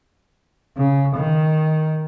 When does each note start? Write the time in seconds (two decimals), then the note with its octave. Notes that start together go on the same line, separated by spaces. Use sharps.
0.77 C#3
1.16 D#3